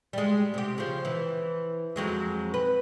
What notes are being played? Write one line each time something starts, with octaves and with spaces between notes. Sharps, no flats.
G3 G#3
C3 G4
C#3 F3
E3
F2 F#3 G#3
B4